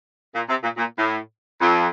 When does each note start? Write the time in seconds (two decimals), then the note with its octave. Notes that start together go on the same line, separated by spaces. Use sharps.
0.35 A#2
0.49 C3
0.63 A#2
0.77 A#2
0.98 A2
1.61 F2